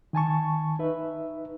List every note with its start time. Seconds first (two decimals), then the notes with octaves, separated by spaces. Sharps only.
0.13 D#3 G#5 A5 C#6
0.79 D#4 B4 E5